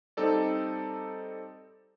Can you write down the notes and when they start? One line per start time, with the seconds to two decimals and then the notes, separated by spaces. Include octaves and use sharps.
0.17 G3 C4 D#4 A4 D5